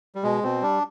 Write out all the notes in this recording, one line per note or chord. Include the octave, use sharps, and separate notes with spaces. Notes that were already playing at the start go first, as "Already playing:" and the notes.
G3
B2 G#3
B2 C4
G3 D4